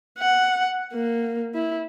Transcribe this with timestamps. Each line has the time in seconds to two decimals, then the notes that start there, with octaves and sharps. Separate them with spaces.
0.19 F#5
0.93 A#3
1.54 E4